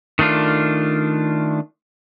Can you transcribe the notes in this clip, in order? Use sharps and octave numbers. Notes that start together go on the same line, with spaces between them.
D#3 A3 D4 F4